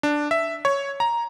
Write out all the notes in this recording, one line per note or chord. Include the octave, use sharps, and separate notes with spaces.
D4
E5
C#5
A#5